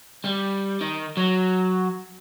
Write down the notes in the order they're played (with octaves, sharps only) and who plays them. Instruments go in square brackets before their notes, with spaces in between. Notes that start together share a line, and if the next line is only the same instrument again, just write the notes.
[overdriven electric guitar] G3
D#3
F#3